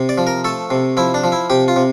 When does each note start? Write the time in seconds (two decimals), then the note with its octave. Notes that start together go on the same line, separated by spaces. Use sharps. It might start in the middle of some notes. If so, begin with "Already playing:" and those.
Already playing: C3
0.09 D5
0.18 F3
0.27 A#4
0.44 A3 A4
0.70 C3
0.97 F3 E4
1.14 D4
1.24 F3
1.32 E4
1.50 C3 G4
1.68 F4
1.76 C3